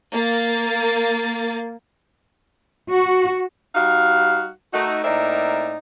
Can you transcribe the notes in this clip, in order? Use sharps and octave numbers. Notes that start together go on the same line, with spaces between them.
A#3 A6
F#4
G3 D#4 F#4 F5
A3 D#4 F#4
A2 A#3 C4 D#4 D5 E5